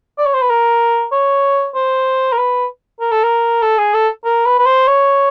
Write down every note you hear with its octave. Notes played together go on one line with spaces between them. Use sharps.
D5
C#5
C5
B4
A#4
C#5
C5
A#4
B4
A#4
A4
A#4
A4
G#4
A4
A#4
B4
B4
C5
C#5